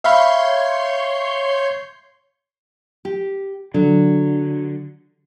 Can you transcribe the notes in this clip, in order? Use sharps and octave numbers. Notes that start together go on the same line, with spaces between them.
C#5 E5 F5 B5 C6 G6
G4
D3 F#3